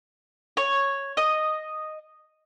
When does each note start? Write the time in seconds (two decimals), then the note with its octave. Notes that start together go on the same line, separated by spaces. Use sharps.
0.57 C#5
1.17 D#5